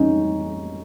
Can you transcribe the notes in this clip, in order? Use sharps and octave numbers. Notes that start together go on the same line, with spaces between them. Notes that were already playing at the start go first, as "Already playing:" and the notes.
Already playing: F2 G3 C#4 D#4